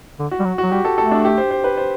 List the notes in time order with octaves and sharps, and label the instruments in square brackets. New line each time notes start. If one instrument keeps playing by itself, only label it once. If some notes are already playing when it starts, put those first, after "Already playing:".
[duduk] D3
[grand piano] F#4
[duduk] G3
F#3
[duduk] F#3 [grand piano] F#4
[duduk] G3 [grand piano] G4
[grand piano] A4
[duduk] A3 [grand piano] A4
[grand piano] D4
G4
C5
C5
B4
C5